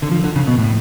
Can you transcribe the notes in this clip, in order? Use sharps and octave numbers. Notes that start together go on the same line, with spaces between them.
D3
F3
D3
C#3
B2
A2